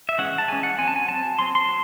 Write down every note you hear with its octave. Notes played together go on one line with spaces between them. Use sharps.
E5
E3 G#3 C#4 F#5
A5
E3 G#3 C#4 G#5
F#5
F#3 C4 G#5 A5
G#5
F#3 C4 A5
F#3 C4 C6
C6
F#3